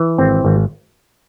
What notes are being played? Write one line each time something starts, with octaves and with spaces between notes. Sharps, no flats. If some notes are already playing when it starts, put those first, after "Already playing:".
Already playing: E3
G#1 C4
G#1